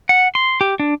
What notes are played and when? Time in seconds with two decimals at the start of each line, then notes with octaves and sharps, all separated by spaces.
0.09 F#5
0.35 C6
0.61 G4
0.80 D4